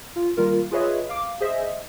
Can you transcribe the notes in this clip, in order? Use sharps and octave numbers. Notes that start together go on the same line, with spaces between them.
F4
D#3 G3 A#3 F4 A#4
F4 G#4 B4 C#5 D#5 E5
F5 D6
G#4 C5 D#5 E5